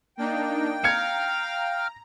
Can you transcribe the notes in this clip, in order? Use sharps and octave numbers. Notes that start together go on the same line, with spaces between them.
A#3 D4 D#4 G5
F5 A#5 G#6 C#7